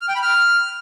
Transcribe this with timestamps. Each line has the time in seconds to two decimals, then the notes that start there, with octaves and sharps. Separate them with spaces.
0.01 F6
0.08 G5
0.15 B5
0.22 F6